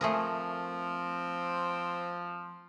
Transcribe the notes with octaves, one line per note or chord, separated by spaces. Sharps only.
F3 A3 C4 G#4 A#4